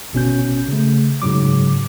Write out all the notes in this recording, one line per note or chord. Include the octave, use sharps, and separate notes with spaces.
G1 B2 C#4 G6
C#3 A3
G#2 C#3 F#3 D6